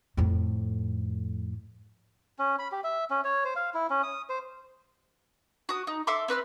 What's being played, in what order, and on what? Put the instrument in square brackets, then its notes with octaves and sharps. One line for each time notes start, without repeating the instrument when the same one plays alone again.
[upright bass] F2 A2
[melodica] C#4
B5
G4
E5
C#4
C#5
C5
F5
E4
C#4
D#6
C5
[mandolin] F#4 D#6
D#4
A4 E5 C6 D6
C4 B4 E6 F6